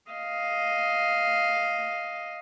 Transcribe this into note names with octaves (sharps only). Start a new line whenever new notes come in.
D#5 F5